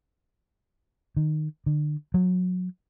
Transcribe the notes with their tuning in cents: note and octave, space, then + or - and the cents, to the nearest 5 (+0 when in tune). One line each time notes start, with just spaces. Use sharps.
D#3 -20
D3 +35
F#3 -25